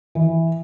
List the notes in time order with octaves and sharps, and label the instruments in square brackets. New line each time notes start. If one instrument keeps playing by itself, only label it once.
[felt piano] E3